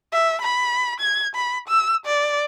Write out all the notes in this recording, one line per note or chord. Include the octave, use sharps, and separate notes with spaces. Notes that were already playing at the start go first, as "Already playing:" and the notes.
E5
B5
G#6
B5
E6
D5